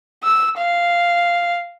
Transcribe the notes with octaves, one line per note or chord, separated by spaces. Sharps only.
E6
F5